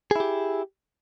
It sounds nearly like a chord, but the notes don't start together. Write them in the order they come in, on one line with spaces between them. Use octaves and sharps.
G#4 E4 G4